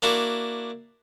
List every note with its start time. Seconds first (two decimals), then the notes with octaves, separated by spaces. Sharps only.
0.02 A#3 D4 E4 F#4